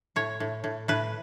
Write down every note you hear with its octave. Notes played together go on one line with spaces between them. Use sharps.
A2 C#5
A2
A2
A2 B4